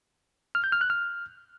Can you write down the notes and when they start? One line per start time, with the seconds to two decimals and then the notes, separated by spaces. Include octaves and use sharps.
0.55 F6
0.64 G6
0.72 F6
0.81 F#6
0.90 F6